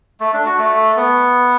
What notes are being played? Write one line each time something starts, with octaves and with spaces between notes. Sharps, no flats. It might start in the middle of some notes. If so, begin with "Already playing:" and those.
A3
D4
F#4
A3
B3